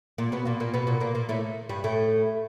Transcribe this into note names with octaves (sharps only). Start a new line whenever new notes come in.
A#2 A#3
B2 B3
A#2 A#3
A#2 A#3
B2 B3
A#2 A#3
A#2 A#3
A#2 A#3
A2 A3
G2 G3
A2 A3